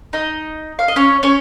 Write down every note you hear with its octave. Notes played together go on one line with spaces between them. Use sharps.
D#4 D#5
F5
D#5
C#4 C#5
C#4 C#5